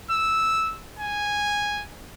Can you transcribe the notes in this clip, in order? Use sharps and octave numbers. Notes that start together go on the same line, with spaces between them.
E6
G#5